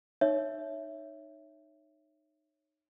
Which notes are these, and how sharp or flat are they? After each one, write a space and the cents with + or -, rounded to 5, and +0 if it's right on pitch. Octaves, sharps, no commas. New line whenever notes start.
D#4 -20 C#5 +0 E5 +5